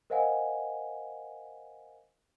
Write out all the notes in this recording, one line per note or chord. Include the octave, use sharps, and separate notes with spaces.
A#4 C5 D#5 F5 F#5 G#5